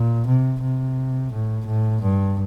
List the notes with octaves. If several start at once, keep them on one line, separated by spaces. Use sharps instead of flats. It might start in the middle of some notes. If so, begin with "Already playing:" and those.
Already playing: A#2
C3
C3
A2
A2
G2